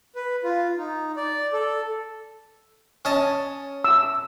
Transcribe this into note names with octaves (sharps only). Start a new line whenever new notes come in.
B4
F4
D#4
D5
A4
C#4 D#5 A5
E6